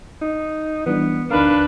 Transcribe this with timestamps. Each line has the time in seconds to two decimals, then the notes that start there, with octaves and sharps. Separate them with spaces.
0.22 D#4
0.86 E3 G3 B3 D4
1.31 D2 D4 D#4 A#4 B4 F5